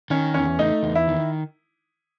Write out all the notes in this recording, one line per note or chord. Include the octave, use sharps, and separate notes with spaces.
D#3 C#4
E2 C#4
A3 D#4
E2
E4
D#3